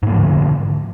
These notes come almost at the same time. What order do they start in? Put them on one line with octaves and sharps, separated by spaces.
G#2 A#3 F3 D3